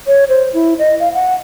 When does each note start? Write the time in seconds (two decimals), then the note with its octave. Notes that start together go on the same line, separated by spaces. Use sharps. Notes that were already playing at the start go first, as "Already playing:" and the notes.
0.07 C#5
0.29 C5
0.54 E4
0.79 D#5
1.00 F5
1.14 F#5